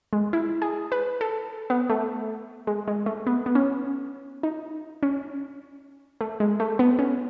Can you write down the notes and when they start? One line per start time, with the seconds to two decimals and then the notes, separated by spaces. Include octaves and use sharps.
0.13 G#3
0.33 E4
0.62 G#4
0.92 B4
1.21 A4
1.70 B3
1.90 A3
2.67 G#3
2.88 G#3
3.06 A3
3.27 B3
3.46 B3
3.55 C#4
4.43 D#4
5.03 C#4
6.21 A3
6.40 G#3
6.60 A3
6.79 B3
6.99 C#4